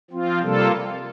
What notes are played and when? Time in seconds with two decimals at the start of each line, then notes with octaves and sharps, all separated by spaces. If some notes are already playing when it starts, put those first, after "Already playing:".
0.11 F3 C4 F4
0.42 C3 G3 A#3 F4 A4